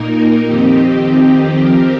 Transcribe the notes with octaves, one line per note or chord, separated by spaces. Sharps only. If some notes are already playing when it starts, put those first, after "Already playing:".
Already playing: A#2 A#3 D#4 A#4
F2 D#3 C4 D#4 G4
F3 C4 G4 A#4